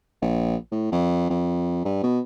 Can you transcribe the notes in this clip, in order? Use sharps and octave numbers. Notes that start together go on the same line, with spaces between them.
A#1
A2
F2
F2
G2
B2